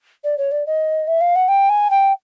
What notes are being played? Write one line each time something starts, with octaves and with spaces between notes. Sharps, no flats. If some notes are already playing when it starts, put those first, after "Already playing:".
D5
C#5
D5
D#5
E5
F5
F#5
G5
G#5
G5